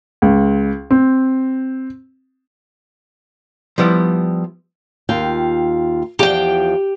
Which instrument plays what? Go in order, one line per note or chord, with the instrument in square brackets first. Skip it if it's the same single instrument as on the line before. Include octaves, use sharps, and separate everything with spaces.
[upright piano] C#2
C4
[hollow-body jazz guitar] F3 G3 B3 E4
[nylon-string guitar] D#2 F4 G5
[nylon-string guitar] E2 F3 [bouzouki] G4 G5